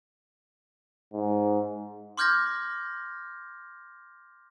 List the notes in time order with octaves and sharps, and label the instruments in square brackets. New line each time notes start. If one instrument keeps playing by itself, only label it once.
[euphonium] G#2
[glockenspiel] C6 D6 F6 G6 G#6 A#6